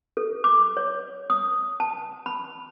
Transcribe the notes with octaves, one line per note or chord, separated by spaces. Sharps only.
A4
D6
C#5
D#6
A5
B5